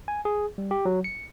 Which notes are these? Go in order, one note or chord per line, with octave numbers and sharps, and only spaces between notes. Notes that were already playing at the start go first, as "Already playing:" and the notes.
G#5
G#4
G3
G4
F#3
C#7